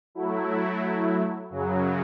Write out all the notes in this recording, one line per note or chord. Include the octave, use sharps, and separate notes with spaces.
F#3 A3 E4
F#2 C#3 F#3